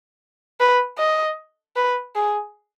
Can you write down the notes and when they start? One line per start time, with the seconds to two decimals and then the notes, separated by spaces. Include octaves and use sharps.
0.60 B4
0.99 D#5
1.76 B4
2.15 G#4